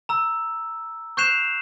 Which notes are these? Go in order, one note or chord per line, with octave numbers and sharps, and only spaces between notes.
A#5 E6
C#6 F#6 G6 C7 E7 F7